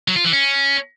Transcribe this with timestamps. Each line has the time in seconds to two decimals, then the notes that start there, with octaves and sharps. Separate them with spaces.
0.08 F#3
0.16 F4
0.24 E3
0.33 C#4